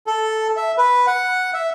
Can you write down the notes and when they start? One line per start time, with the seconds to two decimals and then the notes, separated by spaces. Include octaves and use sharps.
0.07 A4
0.57 E5
0.78 B4
1.07 F#5
1.54 E5